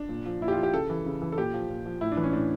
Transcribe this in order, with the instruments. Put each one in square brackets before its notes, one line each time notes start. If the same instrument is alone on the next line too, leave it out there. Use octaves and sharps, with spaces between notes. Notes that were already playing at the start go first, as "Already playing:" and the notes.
Already playing: [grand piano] D4
A#2
F3
A#2 E4
G4
F4
F3
G4
C#3 A4
E3
C#3
E3
A4
A#2 G4
F3
A#2
F3
A2 E4
D4
E3
C#4
A2 D4